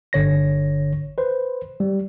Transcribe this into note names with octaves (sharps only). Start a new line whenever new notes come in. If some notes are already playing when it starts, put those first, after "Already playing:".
G1 D3 C#5 A#6
B4 C5
G3